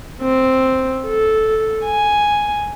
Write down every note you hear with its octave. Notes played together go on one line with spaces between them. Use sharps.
C4
A4
G#5